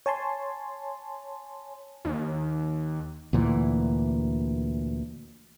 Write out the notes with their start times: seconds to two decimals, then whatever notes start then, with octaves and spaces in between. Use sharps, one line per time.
0.06 C#5 G#5 A5 C6
2.05 D#2
3.33 D2 A#2 E3